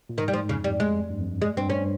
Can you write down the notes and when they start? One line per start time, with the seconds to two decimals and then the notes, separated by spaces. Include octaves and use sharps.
0.09 A#2
0.18 G#2 D#3
0.28 G3
0.33 G#2 F3
0.49 F2 C#3
0.64 G3
0.80 G#3
1.10 G2
1.20 F2
1.30 G2
1.42 G#3
1.57 G2 C4
1.70 G2 C#4